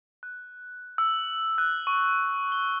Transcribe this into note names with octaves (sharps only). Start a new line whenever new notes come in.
F#6
E6
F#6
C#6
G7